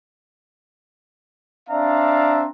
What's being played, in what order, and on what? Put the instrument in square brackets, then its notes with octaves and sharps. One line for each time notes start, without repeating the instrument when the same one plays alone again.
[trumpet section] C4 D4 D5 E5 F5 A#5